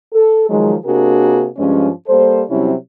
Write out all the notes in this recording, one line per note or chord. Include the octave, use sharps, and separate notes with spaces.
A4
D#3 F3 F#3 G#3
C3 A#3 D4 F#4 G#4 A#4
G2 F3 G#3 C#4
G3 A#3 A4 C5
C3 F#3 G3 C4 C#4 E4